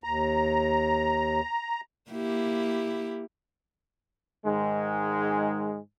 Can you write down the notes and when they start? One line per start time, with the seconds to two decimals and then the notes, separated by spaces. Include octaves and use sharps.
0.04 D#2 A#5
2.11 A#3 E4 G4
4.45 G#2 D#3 G#3